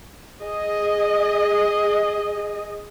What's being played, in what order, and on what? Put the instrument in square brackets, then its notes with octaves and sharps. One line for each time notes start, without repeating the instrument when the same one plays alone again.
[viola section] G#4 D#5